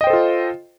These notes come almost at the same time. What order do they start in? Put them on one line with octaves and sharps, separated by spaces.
D#5 G5 C5 A4 F4